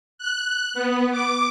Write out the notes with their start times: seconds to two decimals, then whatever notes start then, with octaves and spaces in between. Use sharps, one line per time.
0.18 F#6
0.74 B3
1.11 D6